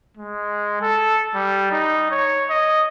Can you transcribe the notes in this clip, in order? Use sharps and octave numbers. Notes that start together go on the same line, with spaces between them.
G#3
A4
G3
D#4
C#5
D#5